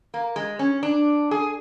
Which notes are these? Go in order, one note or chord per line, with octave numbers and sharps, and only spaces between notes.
A#3
G#3
C#4
D4
G#4